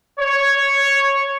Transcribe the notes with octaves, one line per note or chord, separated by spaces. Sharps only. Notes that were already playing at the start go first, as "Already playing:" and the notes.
C#5